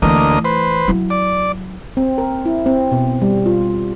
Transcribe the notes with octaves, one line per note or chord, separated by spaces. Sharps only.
D2 E3 A3 A#3 D#5
B4 C5
F#3 E4
D5
C4
A#4
E4
C4
B2
G3
F4